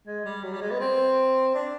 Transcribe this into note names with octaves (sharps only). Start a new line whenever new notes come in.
G#3
G3
F#3
G3
G#3
B3
C4
D4